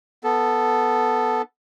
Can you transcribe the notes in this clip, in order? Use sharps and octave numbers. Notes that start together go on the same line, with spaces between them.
B3 A4